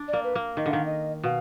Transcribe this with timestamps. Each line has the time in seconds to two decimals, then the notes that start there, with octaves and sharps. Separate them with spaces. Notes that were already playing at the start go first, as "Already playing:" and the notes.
Already playing: D4
0.08 D5
0.13 A#3
0.24 B4
0.35 A#3
0.57 D#3 D#5
0.66 D3
0.71 D#3 F5
0.86 D#5
1.24 B2 F5